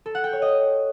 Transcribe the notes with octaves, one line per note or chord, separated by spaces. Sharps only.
A4
F#5
G5
C#5
D#5